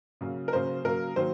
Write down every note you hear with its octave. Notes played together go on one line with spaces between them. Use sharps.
C#3 F#3 A#3
A#4
C#3 F#3 A#3 C5
C#3 F#3 A#3 A#4
D#3 F#3 A#3 C5